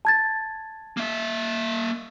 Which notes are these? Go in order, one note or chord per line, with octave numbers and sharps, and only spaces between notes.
A5 G#6 A6
A#3 E5